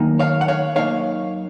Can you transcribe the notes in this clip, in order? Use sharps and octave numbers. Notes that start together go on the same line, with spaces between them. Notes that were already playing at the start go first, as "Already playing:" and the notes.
Already playing: F#2 D#3 A#3 D#4
C#5 F5
F#5
C#5 F5
F#2 D#3 A#3 D#4 C#5 F5